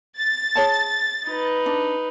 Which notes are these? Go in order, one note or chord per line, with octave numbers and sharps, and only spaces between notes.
A6
G#4 C#5 A5
D#4 B4
D4